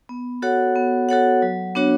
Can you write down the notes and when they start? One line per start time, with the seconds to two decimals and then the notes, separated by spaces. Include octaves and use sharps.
0.09 B3
0.42 F#4 A4 C#5 F#5
0.75 B3
1.09 F#4 A4 C#5 F#5
1.42 F#3
1.75 B3 D4 F#4 C#5